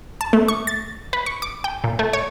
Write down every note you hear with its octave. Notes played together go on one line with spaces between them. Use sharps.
A5
A3
C#6
A6
B4
C#6
D6
G5
A#2
A3
C#5